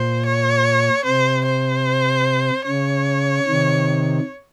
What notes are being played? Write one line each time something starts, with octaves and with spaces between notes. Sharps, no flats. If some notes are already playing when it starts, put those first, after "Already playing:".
Already playing: A#2 C5
C#5
C3 C5
C5
C#3 C#5
C3 D#3